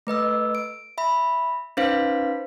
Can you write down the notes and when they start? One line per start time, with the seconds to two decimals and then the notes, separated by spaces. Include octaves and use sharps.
0.07 A3 B4 D#5 E6
0.55 D7
0.98 E5 B5
1.77 C#4 D#4 B4 C5 F5 B6